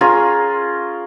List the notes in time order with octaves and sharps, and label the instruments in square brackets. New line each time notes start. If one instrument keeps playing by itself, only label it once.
[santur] C#4 F4 G#4 A#4